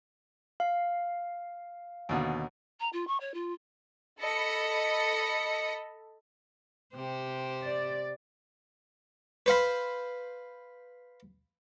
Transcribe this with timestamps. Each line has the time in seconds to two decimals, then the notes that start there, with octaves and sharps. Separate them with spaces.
0.60 F5
2.09 D#2 B2 D3
2.80 A#5
2.93 F4
3.07 C#6
3.20 C#5
3.34 F4
4.19 A4 D#5 B5 C#7
6.95 C3 G4 C5
7.64 D5
9.46 B4 C5 F5 B5